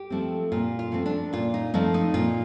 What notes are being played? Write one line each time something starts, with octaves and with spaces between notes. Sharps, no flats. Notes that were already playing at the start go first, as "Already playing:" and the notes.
Already playing: G4
F3 A3 C4
A#2 F4
F4
F3 A3 C4
D4
A#2 F4
D#4
F3 A3 C4 D#4
D#4
A#2 F4